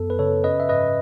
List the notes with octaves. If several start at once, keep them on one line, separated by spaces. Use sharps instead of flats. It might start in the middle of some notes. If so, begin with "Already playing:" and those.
Already playing: F#2 B3 A4
B4
C#3 A4 C#5
C#4 B4 D#5
E5
G#2 B4 D#5